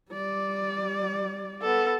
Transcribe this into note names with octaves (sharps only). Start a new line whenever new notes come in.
G3 D5
B3 A4